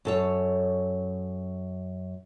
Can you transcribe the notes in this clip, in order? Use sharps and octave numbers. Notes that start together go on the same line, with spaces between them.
F#2 A4 C#5